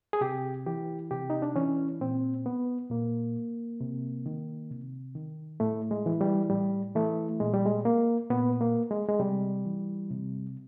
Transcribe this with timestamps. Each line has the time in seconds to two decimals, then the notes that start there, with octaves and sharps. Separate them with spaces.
0.13 G#4
0.21 C3 G4
0.66 E3 G4
1.11 C3 G4
1.30 D#4
1.42 D4
1.56 E3 C#4
2.01 A#2 C4
2.46 B3
2.90 A#2 A#3
3.81 C3
4.26 D#3
4.71 C3
5.15 D#3
5.60 A2 A3
5.91 G#3
6.06 E3
6.21 G3
6.50 A2 G3
6.95 E3 A3
7.40 A#2 G#3
7.53 G3
7.65 G#3
7.85 A#3
8.30 A#2 B3
8.61 A#3
8.91 G#3
9.09 G#3
9.20 C3 G3
9.65 E3
10.11 C3